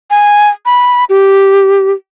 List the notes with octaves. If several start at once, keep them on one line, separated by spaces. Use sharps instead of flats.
G#5
B5
G4